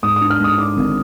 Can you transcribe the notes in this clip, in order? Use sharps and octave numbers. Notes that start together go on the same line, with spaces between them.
G#2 D#6
D#6
D4
F6
G#2 D#6
D4 D6
G#1